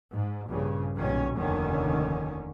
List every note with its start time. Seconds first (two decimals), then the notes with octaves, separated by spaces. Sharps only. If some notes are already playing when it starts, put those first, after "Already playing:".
0.13 G#2
0.47 A#1 G2 C#3
0.96 B1 A#2 D#3 G3 C#4
1.37 F1 D#2 D3 D#3 C#4